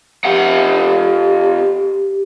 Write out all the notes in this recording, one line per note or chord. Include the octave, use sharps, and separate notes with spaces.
F2 G4 F#5